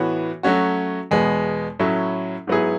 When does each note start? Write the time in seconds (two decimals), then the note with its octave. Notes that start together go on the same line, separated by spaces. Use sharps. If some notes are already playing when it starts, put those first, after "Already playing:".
Already playing: A2 E3 B3 F#4 C#5
0.43 F#3 A3 C#4 F#4
1.11 E2 B2 G#3 B3
1.79 A2 F#3 C#4 E4
2.47 G#2 F#3 B3 E4 G#4